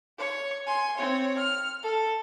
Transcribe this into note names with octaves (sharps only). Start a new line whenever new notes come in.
C#5 C#6
G#5 C6
C4 C#5
F6
A4